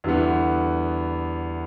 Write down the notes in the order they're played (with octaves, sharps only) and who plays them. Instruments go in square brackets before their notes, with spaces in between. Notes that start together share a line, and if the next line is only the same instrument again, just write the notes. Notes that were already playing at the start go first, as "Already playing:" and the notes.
[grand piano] E2 D3 G3 B3